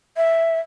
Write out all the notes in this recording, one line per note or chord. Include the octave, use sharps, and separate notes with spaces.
E5